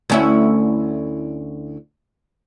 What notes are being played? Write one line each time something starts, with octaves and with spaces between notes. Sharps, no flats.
D2 C#4 E4